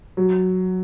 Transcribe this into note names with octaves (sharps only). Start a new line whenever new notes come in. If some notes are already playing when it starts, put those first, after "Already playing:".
F#3